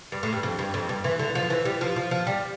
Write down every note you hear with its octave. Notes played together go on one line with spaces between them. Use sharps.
G2
A2
G2
F2
G2
F2
G2
E3
D3
F3
E3
G3
F3
F3
F3
G3